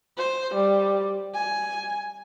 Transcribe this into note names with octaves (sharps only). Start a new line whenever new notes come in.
C5
G3
G#5